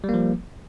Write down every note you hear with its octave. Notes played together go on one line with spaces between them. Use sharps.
F3 G3 A#3